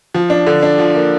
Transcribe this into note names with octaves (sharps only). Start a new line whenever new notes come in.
F3
D4
D3
D4
F3
A#3